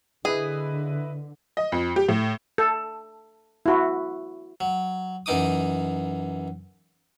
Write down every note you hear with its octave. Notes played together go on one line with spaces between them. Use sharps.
D3 E4 G#4 B4 D#5
D#5
F2
G4
A2
A4
E4 F#4
F#3
F#2 E3 D#4 D6 D#6